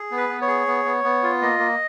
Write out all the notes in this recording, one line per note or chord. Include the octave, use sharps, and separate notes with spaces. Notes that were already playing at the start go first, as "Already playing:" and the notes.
Already playing: G#4
B3
B4
B3
C#5
G#4
B3
B3
B3
F4
A#3 D#5
A#3